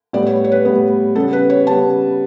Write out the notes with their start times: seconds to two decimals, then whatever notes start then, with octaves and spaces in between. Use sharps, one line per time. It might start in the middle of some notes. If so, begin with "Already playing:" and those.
0.13 A2 G3 B3 D5
0.27 C#5
0.44 C#5
0.52 B4
0.65 A2 G3 B3
1.15 C#3 G3 B3 A4
1.33 B4
1.50 C#5
1.67 C#3 G3 B3 A5